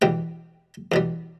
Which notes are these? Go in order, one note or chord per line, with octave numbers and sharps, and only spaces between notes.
E2 B2 G3 G5
E2 B2 G3